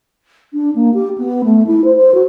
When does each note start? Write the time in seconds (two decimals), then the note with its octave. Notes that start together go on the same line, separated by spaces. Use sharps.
0.54 D4
0.75 A#3
0.94 G4
1.18 B3
1.44 A3
1.67 E4
1.84 C5
1.96 C5
2.14 F#4